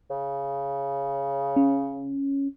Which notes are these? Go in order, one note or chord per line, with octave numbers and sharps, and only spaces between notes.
C#3
C#4